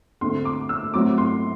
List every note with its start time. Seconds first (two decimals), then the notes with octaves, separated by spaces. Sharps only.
0.21 D2 D3 A3 C4 C6
0.45 D6
0.69 E6
0.94 A2 F#3 C4 D6
1.18 C6